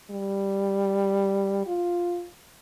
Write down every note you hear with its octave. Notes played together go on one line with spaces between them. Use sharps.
G3
F4